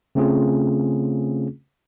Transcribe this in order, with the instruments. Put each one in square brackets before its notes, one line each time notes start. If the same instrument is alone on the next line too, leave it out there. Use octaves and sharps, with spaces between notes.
[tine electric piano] C#3 A3 C4 C#4 F4 G#4